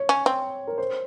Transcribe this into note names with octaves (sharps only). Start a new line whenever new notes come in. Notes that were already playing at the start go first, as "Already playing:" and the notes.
Already playing: C#5
C#4
C4
A#4
C5